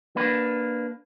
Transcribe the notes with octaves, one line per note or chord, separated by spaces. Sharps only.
A#3 D4 B4